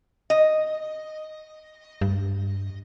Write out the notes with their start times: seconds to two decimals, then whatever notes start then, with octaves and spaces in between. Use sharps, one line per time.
0.30 D#5
2.01 G2